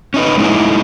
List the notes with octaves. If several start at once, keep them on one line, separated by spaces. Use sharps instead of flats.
C#4 D#4 B4
G#3 A3 D#4 E4